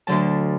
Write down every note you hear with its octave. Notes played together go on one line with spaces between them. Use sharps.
D2 D3 F#3 A5